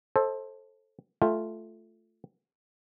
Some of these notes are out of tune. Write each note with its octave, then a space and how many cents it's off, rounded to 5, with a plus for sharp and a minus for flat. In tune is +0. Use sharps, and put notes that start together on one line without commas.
A4 +0 C5 +25 D#5 +20
A3 -5 F4 +0 G5 +20